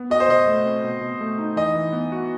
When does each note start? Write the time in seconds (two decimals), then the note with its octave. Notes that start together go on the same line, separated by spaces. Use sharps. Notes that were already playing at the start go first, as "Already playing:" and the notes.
Already playing: B3
0.10 F#4 D#5
0.20 C5
0.28 B2 D#5
0.47 A3
0.66 C4
0.84 B2
1.01 B2
1.21 A3
1.39 D#4
1.56 E3 D#5
1.75 E3
1.93 B3
2.12 F#4